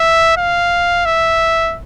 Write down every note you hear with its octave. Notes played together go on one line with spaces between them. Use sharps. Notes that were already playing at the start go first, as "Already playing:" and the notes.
Already playing: E5
F5
E5